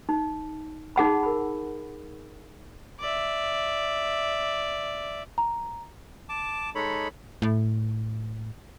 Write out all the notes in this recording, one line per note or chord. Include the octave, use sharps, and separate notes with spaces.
D#4
D#4 G#4 F#5 B5
A#4 B5
D5 E5
A#5
A5 D6
G#3 D#4 A4 C#5 B5
A2